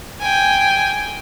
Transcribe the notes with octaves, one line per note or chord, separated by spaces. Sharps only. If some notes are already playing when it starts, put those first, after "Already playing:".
G5 G#5